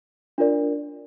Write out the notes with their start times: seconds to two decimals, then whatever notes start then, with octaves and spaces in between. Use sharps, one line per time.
0.38 D4 F4 A#4 D5